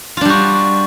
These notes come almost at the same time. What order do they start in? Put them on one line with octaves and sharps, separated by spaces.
F4 D4 G3 F#4